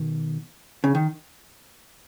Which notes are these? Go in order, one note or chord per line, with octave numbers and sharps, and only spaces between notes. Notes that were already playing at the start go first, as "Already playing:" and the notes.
Already playing: B2 D#3
C#3
D#3